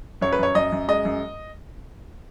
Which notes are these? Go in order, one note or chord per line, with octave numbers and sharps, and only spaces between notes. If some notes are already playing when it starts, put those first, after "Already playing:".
F#2 C#5
B4
F#2 C#5
F#2 D#5
F#2
G#3 D#5
F#2